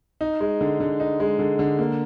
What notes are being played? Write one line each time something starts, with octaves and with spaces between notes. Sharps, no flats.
D#4
G#3
D3
D3
D#4
G#3
D3
D3
A#3